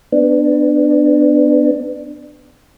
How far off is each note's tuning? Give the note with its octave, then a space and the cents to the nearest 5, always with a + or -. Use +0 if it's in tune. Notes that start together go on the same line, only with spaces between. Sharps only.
B3 +20 D4 +15